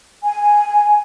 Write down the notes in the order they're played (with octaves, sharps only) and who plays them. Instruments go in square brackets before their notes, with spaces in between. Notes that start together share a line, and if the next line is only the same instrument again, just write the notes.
[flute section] G#5